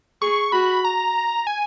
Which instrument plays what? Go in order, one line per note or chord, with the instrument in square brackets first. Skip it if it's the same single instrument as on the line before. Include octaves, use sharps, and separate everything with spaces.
[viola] G#4 [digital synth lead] C#6
[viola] F#4 [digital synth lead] B5
[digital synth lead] A#5
G#5